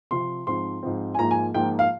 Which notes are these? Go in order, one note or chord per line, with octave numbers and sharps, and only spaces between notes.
C3 F3 C4 F4 C6
G#2 F3 C4 C6
G#2 F3 C4
G#5
G#2 F3 A#3 F4 A#5
G#5
G#2 F3 A#3 F4 G5
F5